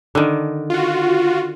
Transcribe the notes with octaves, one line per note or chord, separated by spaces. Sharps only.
D3 D#3
F4 F#4